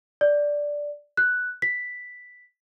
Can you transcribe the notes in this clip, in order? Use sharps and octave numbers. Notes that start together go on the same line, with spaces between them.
D5
F#6
B6